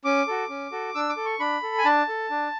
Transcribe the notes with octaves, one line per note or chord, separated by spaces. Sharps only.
C#4 D6
F#4 A4
C#4
F#4 A4
D4 E6
D6
A4
C#6
D4 B5
A4
G#5
D4 A5
A4
D4